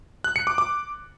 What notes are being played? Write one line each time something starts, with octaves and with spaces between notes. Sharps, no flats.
F#6
C#7
D6
D6